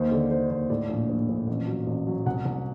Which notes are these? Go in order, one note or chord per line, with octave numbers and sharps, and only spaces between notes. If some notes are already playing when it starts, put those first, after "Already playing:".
Already playing: D#2 C5
D3 D5
D3 C5
D#2 C5
A2 D5
A#1
A#1
A#1
A1
F#3
A1
F#3
C2 F#5
C2